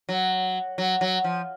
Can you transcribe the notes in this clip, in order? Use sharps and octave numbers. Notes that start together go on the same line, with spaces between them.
F#3
F#3
F#3
F3